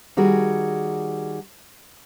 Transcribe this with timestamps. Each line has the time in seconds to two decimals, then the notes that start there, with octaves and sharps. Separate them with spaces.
0.17 D#3 G3 F#4 G#4 A#4